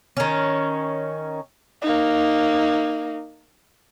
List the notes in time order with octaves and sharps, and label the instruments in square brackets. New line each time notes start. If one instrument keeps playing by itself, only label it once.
[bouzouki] D#3 C#4
[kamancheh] A#3 D#4